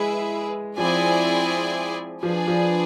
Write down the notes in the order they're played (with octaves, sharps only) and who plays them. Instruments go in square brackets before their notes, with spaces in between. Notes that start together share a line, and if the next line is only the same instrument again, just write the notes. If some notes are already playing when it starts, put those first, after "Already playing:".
Already playing: [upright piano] G#3 [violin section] E4 G#4 B4 E5
[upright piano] F3 [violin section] C4 E4 G#4 D5 G#5
[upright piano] F3 [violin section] D4 G#4 B4 D5 G#5
[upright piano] F3